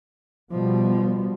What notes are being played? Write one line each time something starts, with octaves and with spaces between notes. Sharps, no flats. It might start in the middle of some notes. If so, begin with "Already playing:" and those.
B2 F3 G3